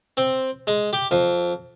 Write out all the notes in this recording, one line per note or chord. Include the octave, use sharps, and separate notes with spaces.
C4
G#3
G4
F2